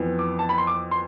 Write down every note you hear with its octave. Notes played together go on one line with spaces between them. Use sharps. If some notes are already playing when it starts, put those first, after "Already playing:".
Already playing: F2 E3 B3
D6
A5
B5
C6
D6
C6